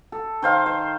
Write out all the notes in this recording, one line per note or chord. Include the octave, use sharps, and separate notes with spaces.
A4
D#3 C5 F5
C5